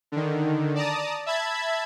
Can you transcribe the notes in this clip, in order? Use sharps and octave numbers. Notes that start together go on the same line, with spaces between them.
D3 D#3
D5 A5 A#5 D#6
E5 A5 B5 G#6